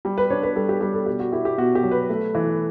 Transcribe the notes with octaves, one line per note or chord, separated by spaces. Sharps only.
G3
B4
D4 C#5
B4
G3 A4
G4
G3 G4
A4
B2 G4
F#4
E4 G4
G4
B2 F#4
G4
F#3
B4
A3
E3